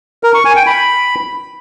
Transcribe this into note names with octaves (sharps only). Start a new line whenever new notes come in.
A#4
C#6
G#5
G5
B5